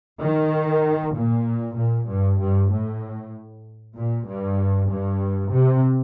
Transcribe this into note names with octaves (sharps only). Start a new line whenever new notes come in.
D#3
A#2
A#2
G2
G2
A2
A#2
G2
G2
C3